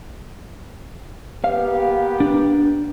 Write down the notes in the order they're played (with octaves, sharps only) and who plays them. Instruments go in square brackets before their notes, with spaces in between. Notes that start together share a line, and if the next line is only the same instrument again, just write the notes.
[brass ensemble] A#3 B3 G4 [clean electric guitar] F5
[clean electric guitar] D4